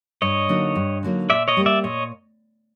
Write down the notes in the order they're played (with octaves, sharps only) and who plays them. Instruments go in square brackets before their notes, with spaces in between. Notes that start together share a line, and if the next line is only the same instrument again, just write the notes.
[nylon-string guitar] G2 [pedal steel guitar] C#5 D#5
[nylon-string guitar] D3 F#3 A#3 D#4
G2
D3 F#3 A#3 D#4
[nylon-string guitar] A#2 [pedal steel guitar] D5 E5
[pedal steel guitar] C#5 D#5
[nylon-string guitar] G3 A#3
[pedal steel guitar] D5 E5
[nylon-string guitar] A#2 [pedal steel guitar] C#5 D#5